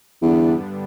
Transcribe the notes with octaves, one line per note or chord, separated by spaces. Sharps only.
E2 G2 D3 G3 B3 D4